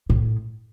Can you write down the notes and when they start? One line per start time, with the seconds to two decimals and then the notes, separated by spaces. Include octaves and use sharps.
0.10 A2